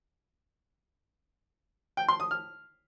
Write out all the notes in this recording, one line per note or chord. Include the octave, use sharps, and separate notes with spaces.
G5
C6
D#6
F6